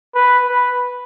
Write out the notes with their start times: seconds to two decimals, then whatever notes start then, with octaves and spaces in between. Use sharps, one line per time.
0.15 B4
0.48 B4